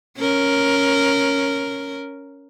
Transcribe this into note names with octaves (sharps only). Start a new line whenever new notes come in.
C#4 A#4